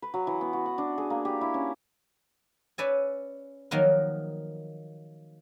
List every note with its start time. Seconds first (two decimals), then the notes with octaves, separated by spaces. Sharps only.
0.02 B4
0.14 F#3
0.27 E3
0.41 B3
0.53 F#4
0.66 F#5
0.78 D4
0.98 G#4
1.10 A#3
1.25 G4
1.41 E4
1.54 C#4
2.78 C#4 B4 D5 E5 G#5
3.71 D#3 F3 F#3 A#3 D#4 A#4